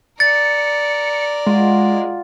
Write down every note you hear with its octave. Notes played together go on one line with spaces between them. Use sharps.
A#4 D5 A6 C#7
G#3 F4 F#4